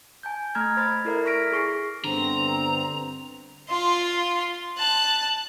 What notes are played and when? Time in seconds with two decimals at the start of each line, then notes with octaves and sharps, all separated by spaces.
0.23 G#5 A5 G6
0.55 A3 A#5 F6 G#6
0.77 C5 B5 A6
1.05 E4 A4 A#4 D5 E5
1.25 C#6 F6 A#6 B6 D7
1.52 G#4 C#6 C7
2.04 G2 D3 B3 C4 A#5
3.69 F4 C6
4.77 A5 F#6